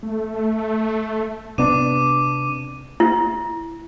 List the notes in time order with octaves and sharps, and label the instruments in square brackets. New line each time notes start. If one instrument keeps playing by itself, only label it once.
[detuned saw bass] A3
[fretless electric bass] C3 B3 D4 [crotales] D6 D#7
[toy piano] E4